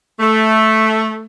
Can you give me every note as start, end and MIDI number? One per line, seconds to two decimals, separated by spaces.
0.19 1.24 57